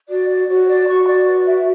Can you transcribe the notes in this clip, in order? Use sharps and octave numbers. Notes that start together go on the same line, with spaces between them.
F#4 D5
D5
F#4 C#5
D5
F#4 C#6
D5
B4 D5
E5